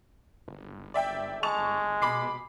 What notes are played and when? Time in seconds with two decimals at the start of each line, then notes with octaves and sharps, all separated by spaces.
0.48 G1
0.94 D5 E5 G5
1.43 G#3 A5 C#6 F7
2.02 B2 B5 D6 C7